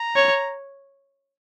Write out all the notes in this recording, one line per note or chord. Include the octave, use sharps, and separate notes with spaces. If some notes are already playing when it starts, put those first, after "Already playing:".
Already playing: A#5
C#5